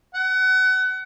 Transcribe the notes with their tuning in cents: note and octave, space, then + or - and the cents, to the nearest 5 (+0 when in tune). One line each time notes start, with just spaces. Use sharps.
F#5 +30